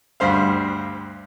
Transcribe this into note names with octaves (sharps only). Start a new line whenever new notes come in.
D2 G2 C5 F5